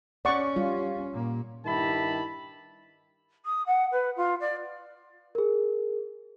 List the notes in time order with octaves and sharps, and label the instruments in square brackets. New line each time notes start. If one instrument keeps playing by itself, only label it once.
[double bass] C#4 [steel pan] D5 F#5 C#6
[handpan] G3 F4
[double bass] A#2 A#3
[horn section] G2 D#3 E4 G4 A5 B5
[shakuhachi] D#6
F#5
B4
F4
D5
[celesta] G#4 A#4